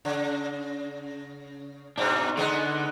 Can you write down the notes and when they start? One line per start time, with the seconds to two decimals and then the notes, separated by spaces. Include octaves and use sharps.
0.05 C#3
1.98 G#2 B2 D4 D#4
2.37 D3 G#3 B3 D#4